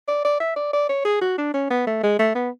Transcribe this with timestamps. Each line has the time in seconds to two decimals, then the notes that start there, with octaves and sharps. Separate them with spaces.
0.08 D5
0.25 D5
0.40 E5
0.56 D5
0.73 D5
0.89 C#5
1.05 G#4
1.22 F#4
1.38 D4
1.54 C#4
1.70 B3
1.87 A3
2.03 G#3
2.19 A3
2.35 B3